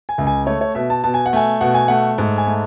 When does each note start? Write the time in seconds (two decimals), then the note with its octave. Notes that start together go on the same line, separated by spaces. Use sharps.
0.09 G#5
0.18 C#2
0.27 G#5
0.46 A3 C#5
0.61 C#5
0.75 B2 E5
0.90 A5
1.04 B2 A5
1.14 G#5
1.26 F#5
1.33 A3 G#5
1.61 B2 F#5
1.74 G#5
1.88 A3 F#5
2.18 G#2
2.38 G#5
2.46 A3